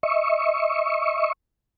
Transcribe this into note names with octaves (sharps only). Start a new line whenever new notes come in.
D#5 E5 C#6